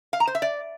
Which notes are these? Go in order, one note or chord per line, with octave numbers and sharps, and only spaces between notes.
F5
A#5
C5
E5
D5